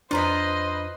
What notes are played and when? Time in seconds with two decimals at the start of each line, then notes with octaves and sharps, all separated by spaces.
0.11 F2 D4 F4 B4 C5 D#5 A#5 B5